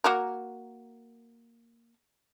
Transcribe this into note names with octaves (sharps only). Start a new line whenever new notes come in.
A#3 F#4 A#4